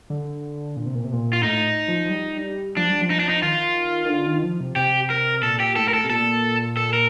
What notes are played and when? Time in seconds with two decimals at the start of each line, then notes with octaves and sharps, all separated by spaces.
0.10 D3
0.76 A#2
0.86 C3
0.95 A#2
1.04 C3
1.13 A#2
1.33 F4
1.43 A2 D#4
1.88 F3
2.05 F3
2.10 G3
2.77 F3 D4
2.89 G3
3.01 F3
3.10 D#4
3.20 D4
3.29 D#4
3.43 D#3 F4
4.05 D#3
4.09 D3
4.26 D#3
4.43 F3
4.60 C3
4.76 C3 G4
5.10 A#4
5.43 A#2 A4
5.60 G4
5.76 A2 A4
5.88 A#4
5.94 A4
6.04 C3
6.10 A#2 A4
6.77 A4
6.93 A#4